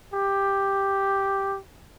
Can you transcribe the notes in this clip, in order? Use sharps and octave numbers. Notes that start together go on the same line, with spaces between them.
G4